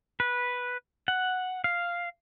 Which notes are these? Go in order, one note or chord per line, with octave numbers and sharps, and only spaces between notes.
B4
F#5
F5